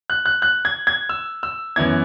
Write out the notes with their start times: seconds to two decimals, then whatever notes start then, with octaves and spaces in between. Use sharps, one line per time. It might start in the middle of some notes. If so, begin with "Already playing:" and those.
0.10 F#6
0.25 F#6
0.42 F#6
0.65 G#6
0.87 G#6
1.09 E6
1.43 E6
1.76 F#2 E3 B3 E4 G#6